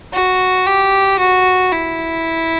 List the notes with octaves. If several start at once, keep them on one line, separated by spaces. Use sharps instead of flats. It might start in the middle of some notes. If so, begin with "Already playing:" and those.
F#4
G4
F#4
E4